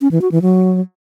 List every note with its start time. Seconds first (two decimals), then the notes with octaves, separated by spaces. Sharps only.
0.01 C#4
0.11 E3
0.21 F#4
0.32 E3
0.42 F#3